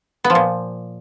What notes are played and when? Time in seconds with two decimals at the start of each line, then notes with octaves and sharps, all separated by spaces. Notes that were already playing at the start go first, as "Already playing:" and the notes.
0.24 B3
0.30 F3
0.35 A#2